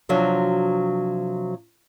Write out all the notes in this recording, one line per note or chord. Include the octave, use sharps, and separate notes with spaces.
C3 F3 F#3 D4 F#4